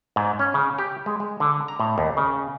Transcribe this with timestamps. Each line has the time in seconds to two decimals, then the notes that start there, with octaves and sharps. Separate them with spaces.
0.16 G#2
0.39 C#4
0.54 C#3
0.78 G4
1.06 G#3
1.20 G#3
1.40 D3
1.68 A#5
1.80 A2
1.98 D#2
2.17 C#3